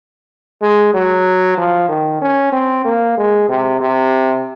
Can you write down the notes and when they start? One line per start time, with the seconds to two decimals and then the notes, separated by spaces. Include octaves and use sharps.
0.62 G#3
0.94 F#3
1.57 F3
1.89 D#3
2.22 C#4
2.52 C4
2.85 A#3
3.17 G#3
3.49 C3
3.81 C3